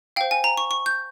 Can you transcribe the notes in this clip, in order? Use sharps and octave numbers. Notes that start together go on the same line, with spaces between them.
C5 F5 G5
G#5
A#5
C#6
C#6
G6